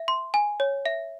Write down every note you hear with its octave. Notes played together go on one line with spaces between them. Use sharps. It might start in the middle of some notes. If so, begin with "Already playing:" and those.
Already playing: E5
C6
G#5
C#5
E5